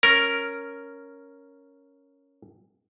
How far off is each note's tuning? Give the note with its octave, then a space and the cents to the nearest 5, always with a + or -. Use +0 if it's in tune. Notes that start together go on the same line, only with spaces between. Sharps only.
C#4 +0 A#4 +0